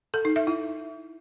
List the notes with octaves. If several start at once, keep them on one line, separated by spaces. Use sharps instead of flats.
A4
D#4
E5
E4